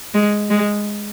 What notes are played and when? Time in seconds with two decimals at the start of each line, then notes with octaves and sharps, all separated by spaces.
0.14 G#3
0.50 G#3